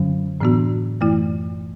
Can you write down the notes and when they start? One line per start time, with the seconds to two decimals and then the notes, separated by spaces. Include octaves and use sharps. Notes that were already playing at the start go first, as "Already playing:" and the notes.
Already playing: F#2 D3 F#3 C#4
0.40 A2 E3 B3 D4 F#4
1.01 F#2 E3 A3 E4